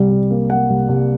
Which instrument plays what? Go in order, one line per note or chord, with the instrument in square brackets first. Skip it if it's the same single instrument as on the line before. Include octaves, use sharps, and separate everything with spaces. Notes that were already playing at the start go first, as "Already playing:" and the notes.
Already playing: [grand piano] C2 G3
C2
A#3
A#3 F#5
C2
C2